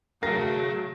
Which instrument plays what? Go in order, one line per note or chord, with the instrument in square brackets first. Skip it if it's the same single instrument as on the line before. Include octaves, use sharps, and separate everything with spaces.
[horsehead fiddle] F#3 A3 [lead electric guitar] G#4 F5 [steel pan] A#4 [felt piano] A#6